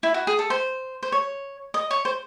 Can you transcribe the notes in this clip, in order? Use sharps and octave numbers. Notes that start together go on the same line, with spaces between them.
E4
F#4
G#4
A4
C5
C5
C#5
D#5
C#5
C5